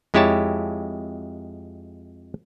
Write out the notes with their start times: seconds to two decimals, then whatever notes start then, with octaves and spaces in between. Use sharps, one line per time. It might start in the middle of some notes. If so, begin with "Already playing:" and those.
0.14 F2 G#3 E4 G4 C#5 A5